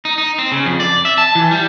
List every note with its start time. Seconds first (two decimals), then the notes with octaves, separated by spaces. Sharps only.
0.05 D#4
0.18 D#4
0.39 C4
0.52 C#3
0.66 F2
0.80 D5
1.05 E5
1.18 A5
1.35 E3
1.51 G3